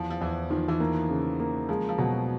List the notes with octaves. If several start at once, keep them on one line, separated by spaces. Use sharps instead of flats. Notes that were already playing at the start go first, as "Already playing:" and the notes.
Already playing: E2 F3
F3
E2 E3
D#3 F3
E3
D#3 A#3
C#3
A#3
F3 G#3
F3
B2 F#3